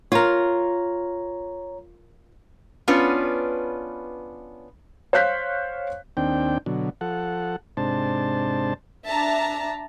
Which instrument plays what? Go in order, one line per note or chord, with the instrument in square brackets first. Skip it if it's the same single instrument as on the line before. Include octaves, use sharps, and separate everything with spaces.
[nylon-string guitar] F4 A#4 [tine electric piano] C#5 A#5
[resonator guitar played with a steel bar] B3 C#4 D4 F4 B4
[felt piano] C5 C#5 F5 F#6 G6 B6
[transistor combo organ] D#2 C4 D4 G5
B2 D3 F#3
F3 A4 F#5
G#2 C3 D4 C5 A5
[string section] D4 E5 A5 A#5